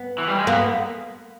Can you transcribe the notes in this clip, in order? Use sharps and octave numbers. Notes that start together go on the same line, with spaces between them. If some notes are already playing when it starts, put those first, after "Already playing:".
Already playing: B3
E3
G3
G#3
A#3 B3